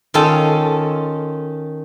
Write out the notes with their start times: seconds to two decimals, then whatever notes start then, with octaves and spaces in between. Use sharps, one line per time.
0.14 D#3 C#4 F4 A4